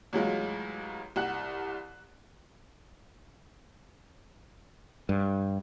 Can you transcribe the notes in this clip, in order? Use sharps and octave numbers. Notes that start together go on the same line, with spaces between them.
A1 F#3 G#3 F4
C2 F#5 F#6
G2